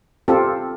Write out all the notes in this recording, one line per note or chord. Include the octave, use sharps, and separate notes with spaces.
C4 F4 G4 A4